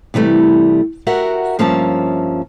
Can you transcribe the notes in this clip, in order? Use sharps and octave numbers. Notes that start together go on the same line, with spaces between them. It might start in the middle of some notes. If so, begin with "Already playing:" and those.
C3 E3 G3 A3
F#4 G4 A#4 E5 F#5
G2 F3 A#3 C#4 E5 A5